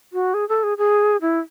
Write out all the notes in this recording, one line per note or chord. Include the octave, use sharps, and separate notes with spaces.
F#4
G#4
A4
G#4
G#4
E4